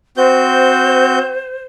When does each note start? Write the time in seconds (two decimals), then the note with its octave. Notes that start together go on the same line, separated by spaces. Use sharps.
0.17 C4 F#4 C5 G6